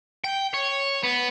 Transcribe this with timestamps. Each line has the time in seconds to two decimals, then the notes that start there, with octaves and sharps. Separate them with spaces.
0.24 G5
0.54 C#5
1.03 B3